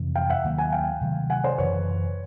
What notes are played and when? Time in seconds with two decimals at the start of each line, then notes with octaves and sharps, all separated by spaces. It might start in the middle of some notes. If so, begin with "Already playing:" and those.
Already playing: F2 C3 E3
0.16 F5 G5
0.30 E5 F#5
0.44 D#2 D#3 F#3 A#3
0.58 F#5 G#5
0.72 F5 G5
1.01 C3 D#3 F#3 A3
1.30 F#5 G#5
1.44 C5 D5
1.58 F#2 C#3 E3 B4 C#5